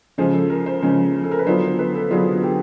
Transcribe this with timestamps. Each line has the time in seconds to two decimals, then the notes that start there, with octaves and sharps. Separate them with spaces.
0.18 C#3 F3 G#3 C#4 C5
0.34 A4
0.50 A#4
0.66 C5
0.82 C#3 F3 G#3 C#4
1.24 A4
1.31 A#4
1.39 B4
1.46 D3 F#3 B3 D4 F4 C5
1.79 B4
1.95 A4
2.11 D3 F#3 B3 D4 F4 G#4
2.43 G4